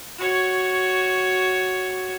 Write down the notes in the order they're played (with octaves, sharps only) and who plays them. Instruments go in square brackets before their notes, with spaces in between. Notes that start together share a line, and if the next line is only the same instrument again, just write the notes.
[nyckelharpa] F#4 C#5